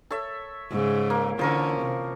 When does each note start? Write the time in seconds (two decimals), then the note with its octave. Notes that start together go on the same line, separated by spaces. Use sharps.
0.11 A4 C#5 E5
0.70 G#2 C#3
1.10 A#3
1.39 D3 E3 F3 C#4 A#4 C#6
1.81 C3